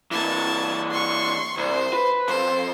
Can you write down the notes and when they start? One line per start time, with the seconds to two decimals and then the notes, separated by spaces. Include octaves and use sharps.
0.11 E3 A#3 A5 G#6
0.91 C6 C#6
1.57 C2 C5
1.93 B4
2.28 F2 C5